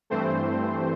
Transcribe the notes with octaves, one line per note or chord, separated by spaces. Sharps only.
G2 E3 A3 C4 C5